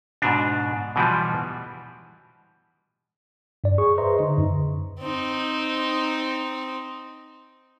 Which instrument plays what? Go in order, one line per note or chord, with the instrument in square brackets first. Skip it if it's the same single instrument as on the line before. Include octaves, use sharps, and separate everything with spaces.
[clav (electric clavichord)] G#2 B2 D4
B2 E3 F3 G3
[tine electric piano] G2 D5
G#4 C#6
B4 C5 D#5 E5 A#5 C6
D3 D#4
F#2
[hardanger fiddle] C4 D#4